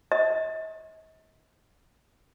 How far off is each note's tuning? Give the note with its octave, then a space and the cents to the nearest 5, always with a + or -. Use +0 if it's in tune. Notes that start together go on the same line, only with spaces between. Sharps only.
D#5 +45